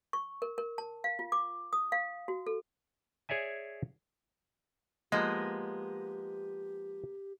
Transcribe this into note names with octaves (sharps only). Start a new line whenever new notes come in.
C#6
A#4
A#4
A5
F5
F4
D6
D#6
F5
F#4
A4
G#4 C#5 D5 E5 G#5
F3 G#3 A#3 B3 G4 D#5